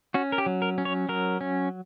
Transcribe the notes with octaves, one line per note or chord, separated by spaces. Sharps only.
C#4 F#4
A#4
G4
F#3
A#4
C#4
C#5
F#3 A#4
C#4